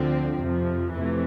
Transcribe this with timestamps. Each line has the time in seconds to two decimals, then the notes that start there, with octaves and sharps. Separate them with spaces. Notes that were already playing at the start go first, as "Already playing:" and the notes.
Already playing: D2 D3 F3 C4
0.36 F2 C3 F3
0.92 F2 C3 E3 A3